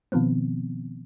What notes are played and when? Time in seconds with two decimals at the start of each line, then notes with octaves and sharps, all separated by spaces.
0.12 B2 D#3 F3 B3 C4